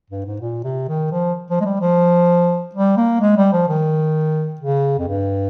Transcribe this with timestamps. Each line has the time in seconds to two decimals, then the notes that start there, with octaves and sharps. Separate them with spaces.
0.10 G2
0.26 G#2
0.41 A#2
0.64 C3
0.88 D#3
1.11 F3
1.50 F3
1.60 G#3
1.65 G3
1.81 F3
2.75 G3
2.97 A#3
3.21 G#3
3.37 G3
3.52 F3
3.68 D#3
4.61 C#3
4.98 F2
5.07 G2